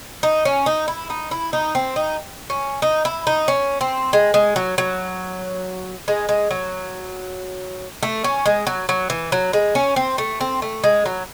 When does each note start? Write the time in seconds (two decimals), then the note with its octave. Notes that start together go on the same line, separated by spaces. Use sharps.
0.23 D#4
0.45 C#4
0.66 D#4
0.88 E4
1.10 D#4
1.31 E4
1.53 D#4
1.75 C4
1.96 D#4
2.50 C#4
2.82 D#4
3.05 E4
3.27 D#4
3.48 C#4
3.81 C4
4.13 G#3
4.34 G#3
4.56 F#3
4.78 F#3
6.08 G#3
6.29 G#3
6.51 F#3
8.03 A3
8.24 C#4
8.46 G#3
8.67 F#3
8.89 F#3
9.10 E3
9.32 F#3
9.53 G#3
9.75 C#4
9.96 C4
10.18 A3
10.41 C4
10.62 A3
10.84 G#3
11.06 F#3